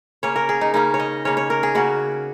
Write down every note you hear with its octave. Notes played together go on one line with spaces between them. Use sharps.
C#3 A#3 C#4 C#5
A#4
G#4
D#4
C#3 A#3 C#4 D#4
C#5
D#5
C#3 A#3 C#4 C#5
C#5
A#4
G#4
C#3 A#3 C#4 F#4